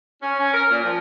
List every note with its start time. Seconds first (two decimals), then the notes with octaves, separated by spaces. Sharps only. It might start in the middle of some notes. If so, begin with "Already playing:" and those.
0.21 C#4
0.38 C#4
0.52 A#4
0.71 A#2
0.84 F3